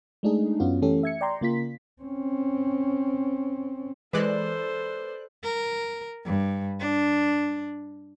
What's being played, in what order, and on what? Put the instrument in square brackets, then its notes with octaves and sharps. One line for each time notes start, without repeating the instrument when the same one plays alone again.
[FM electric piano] G#3 A3 D4 D#4 G#4
F#2 B3 C#4 F4 F#4
E3 A3 C#4 G4 A4
E5 G#6 C#7
D5 G5 A#5 C6
C#3 A#3 F4 B6
[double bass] C4 C#4
[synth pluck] E3 G#3 [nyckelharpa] A4 C5 [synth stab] B4 D5 F#6
[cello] A#4
G2
D4